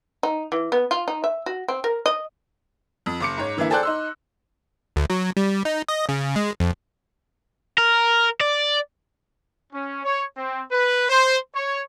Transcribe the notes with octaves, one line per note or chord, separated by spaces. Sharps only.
D#4
E3
B3
F4
D#4
E5
F#4
C4
A#4
D#5
F2
F#1 D6 C#7
G#2 C#5
D3 E3 A#3 E4
G#4 A4 C5 D5 G5 F#6
D#4 C6 E6
D2
F#3
G3
D#4
D#5
C#3
G#3
F2
A#4
D5
C#4
C#5
C4
B4
C5
C#5